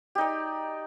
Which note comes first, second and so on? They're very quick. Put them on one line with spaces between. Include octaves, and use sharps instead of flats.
G4 D#4 D5